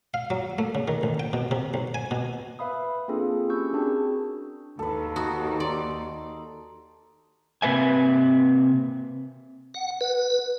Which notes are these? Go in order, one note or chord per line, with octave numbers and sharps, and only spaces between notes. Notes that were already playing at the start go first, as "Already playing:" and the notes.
F5
F#3
A3
C#3
D#3
A1
G5
B2
C3
B1
G#5
B2
B4 E5 F5 B5 D#6
A#3 C4 D4 F4 G#4 A4
C#4 E4 G4 C#6 E6 G6
C4 D4 F#4 G#4 A#4 A5
D#2 A4 B4
D#4 F#4 D#5
D5 C6
C3 A#3 B4 E5 G#5
F#5
B4